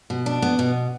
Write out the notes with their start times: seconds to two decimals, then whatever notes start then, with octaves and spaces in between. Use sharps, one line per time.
0.10 B2
0.26 D4
0.42 B3
0.59 B2